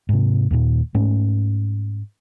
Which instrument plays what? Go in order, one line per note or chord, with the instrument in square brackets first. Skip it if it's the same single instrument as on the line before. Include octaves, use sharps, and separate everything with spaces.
[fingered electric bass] G#2 C3
D#2 A#2
G#2 A3 C#4